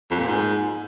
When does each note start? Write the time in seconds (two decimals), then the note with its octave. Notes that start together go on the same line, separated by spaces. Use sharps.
0.11 F2
0.19 A#2
0.28 G#2